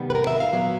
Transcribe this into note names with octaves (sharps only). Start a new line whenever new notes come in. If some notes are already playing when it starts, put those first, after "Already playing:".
Already playing: C3 D#3 G3 B3
B4
A#4
E5
F5
A#2 F#3 B3